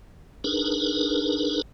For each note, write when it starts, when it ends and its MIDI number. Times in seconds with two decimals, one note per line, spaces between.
0.44 1.62 62
0.44 1.62 63
0.44 1.62 68
0.44 1.62 70
0.44 1.62 71